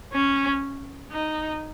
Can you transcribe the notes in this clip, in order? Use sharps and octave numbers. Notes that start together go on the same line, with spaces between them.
C#4
D#4